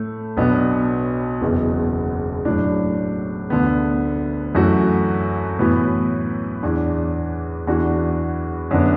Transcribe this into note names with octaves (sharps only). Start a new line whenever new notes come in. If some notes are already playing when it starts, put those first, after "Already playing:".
Already playing: A2 A3
B1 B2 B3 D4
F#1 E2 B2
A2 F#3 D4
D2 D3 B3
F#2 E3 A3 F#4
A2 E3 B3 F#4
E2 E3 D4
E2 E3 D4 F#4
F#2 D3 B3 D4